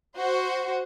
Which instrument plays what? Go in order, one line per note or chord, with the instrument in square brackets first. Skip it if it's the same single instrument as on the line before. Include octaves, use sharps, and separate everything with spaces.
[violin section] F#4 C5